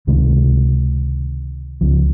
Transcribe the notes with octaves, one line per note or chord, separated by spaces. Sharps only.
C#2 C3 D#3 G#3
C#2 C#3 F3